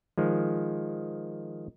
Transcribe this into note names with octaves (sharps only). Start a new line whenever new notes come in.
D#3 F3 G#3